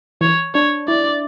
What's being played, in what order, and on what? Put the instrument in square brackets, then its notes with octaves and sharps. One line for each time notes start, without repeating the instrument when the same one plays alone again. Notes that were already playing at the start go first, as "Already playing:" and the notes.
[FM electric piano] E3 [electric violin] C#5
[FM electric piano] D4 [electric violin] C#5
[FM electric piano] E4 [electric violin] D5